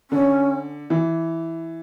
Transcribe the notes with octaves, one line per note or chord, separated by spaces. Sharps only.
D3 C#4
E3